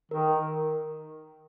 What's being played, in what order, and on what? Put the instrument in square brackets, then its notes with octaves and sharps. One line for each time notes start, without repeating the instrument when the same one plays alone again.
[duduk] D#3 [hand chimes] A#4